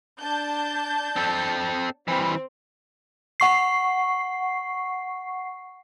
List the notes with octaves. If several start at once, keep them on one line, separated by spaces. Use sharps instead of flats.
D4 A5 G6
C4 A4
E3 G3 C4
F#5 C#6 C7